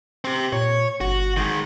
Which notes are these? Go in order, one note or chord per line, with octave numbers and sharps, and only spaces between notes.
C4 G4
A#2 C#5
G1 F#4
D#3 G#3